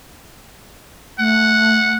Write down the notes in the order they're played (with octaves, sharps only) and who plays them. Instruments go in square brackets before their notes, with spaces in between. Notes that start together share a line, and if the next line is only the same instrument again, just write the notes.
[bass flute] A3 [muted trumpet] F#5